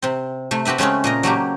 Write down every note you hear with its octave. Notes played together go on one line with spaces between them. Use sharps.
C3 C4
C3 A3
C4 F#4 G4 B4 E5
C#3 G#3 A3 C4 C#4
A#2 A#4 D#5
F#3 A3 A#3 G4